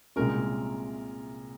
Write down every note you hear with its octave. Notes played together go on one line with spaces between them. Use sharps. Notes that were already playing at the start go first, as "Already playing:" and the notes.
C2 A#2 G#3 C#4 A#4